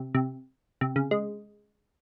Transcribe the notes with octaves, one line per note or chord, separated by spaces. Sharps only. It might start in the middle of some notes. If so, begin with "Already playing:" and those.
Already playing: C3
C3
C3
C#3
G#3